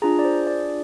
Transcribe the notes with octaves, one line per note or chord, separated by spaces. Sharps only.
D4 F4 G#4 A#5
D5
C5
D5